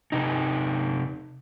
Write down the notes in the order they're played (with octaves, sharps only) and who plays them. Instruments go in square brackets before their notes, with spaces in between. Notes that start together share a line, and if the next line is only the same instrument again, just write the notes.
[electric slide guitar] C3 D#4